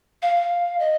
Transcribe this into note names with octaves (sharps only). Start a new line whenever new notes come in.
F5
F5
D#5